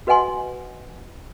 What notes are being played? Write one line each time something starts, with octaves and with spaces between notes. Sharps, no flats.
F#4 B4 D#5 F#5 G#5 C6